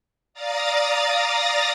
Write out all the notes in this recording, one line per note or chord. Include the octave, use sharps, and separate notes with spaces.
D5 F5 A#5 D#6 A6 A#6